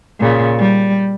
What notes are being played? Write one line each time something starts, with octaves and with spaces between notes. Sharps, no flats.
A#2 C#3
G3